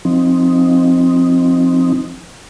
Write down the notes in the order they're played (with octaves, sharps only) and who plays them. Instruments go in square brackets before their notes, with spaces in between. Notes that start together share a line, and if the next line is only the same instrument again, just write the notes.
[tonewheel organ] F3 C4 D#4